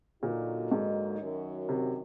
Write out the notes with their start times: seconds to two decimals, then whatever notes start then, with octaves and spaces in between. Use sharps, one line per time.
0.23 A#2 D3 F#3 A#3 D#4 F#4
0.71 G#2
1.20 F#2 D#3 F#3
1.69 C3